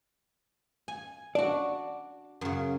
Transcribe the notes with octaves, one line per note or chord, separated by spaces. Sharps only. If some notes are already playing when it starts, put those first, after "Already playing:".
G#5
D4 F#4 D5
F#2 C#3